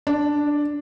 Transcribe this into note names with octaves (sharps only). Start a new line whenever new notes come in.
D4